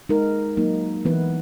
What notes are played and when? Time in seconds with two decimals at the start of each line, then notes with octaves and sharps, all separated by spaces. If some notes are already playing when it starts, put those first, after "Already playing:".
0.09 G#3 D#4 A#4
0.57 F#3 A#3 D#4
1.05 E3 B3 E4 B4